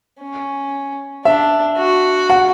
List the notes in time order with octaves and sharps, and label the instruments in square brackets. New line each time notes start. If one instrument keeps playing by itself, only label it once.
[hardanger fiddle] C#4
[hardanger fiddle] D4 [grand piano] E5
[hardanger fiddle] F#4
[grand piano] F#5